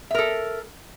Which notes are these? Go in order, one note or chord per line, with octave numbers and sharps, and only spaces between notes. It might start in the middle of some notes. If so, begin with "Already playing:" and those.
A4 A#4 E5